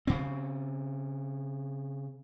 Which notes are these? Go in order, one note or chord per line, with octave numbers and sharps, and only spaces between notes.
C#3 C4